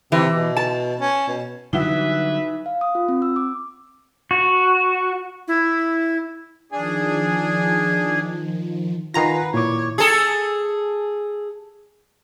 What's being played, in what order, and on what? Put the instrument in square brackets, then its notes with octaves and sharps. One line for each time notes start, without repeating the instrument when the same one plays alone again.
[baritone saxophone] C3 [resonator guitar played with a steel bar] E3
[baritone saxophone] B2
[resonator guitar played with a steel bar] A5
[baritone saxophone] C#4
B2
[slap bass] D3 F#3 G3 [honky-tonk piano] E3 F#4 [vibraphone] D#4 [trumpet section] B4 E5
[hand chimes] F5
D#6
F4
C4
E6
D6
[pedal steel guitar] F#4
[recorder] E4
[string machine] D#3 F3 [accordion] D4 G#4 G#5
[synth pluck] D#3 A#5 A#6 [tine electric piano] F4 G#5 C7 [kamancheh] B4 F#5
[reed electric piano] A#2 D6 [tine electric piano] E4 [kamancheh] C#5
[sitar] G#4 A4